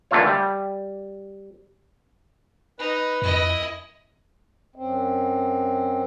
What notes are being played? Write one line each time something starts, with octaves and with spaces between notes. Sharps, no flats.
D3 E3 A3 A#3 F4 C#5
G3
D#4 B4
F2 E4 D#5
F#2 C4